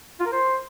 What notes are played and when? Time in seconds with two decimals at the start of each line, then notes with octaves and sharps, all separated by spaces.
0.20 F4
0.26 A#4
0.32 C5